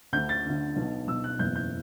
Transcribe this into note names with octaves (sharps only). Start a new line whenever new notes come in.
D2 D3 G6
A6
D2 D3
B1 B2
B1 B2 E6
F#6
F#1 E2 B2 G6
G6